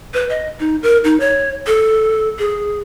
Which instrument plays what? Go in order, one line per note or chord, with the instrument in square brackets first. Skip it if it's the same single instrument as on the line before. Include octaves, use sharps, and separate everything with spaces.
[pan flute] B4
D#5
D#4
A#4
D#4
C#5
A4
G#4